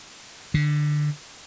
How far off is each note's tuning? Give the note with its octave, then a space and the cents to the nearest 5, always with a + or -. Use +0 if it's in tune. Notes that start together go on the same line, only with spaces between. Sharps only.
D3 +20